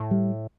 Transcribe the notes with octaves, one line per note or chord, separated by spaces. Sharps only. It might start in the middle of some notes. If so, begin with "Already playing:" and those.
Already playing: A2
G3